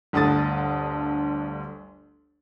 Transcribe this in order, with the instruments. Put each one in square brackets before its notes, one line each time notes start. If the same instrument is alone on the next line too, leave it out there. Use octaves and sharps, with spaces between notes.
[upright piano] G1 D2 A4 D#6 A6